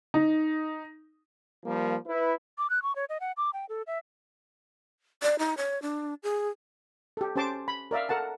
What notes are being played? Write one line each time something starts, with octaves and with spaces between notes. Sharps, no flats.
D#4
F3 G3 A#3
E4 B4
D6
F#6
C#6
C#5
D#5
F#5
D6
G5
A4
E5
D5
D#4
C#5
D4
G#4
G4 A4
C#4 G4 C5 A5 C6 D6
B5
A#4 D5 E5 F5
A4 A#4 F#5 A5